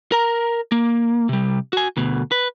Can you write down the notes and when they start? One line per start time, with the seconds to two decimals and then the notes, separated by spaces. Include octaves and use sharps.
0.12 A#4 A#5
0.72 A#3
1.29 C3 G3
1.73 F#4 G#5
1.97 D2 B2
2.32 B4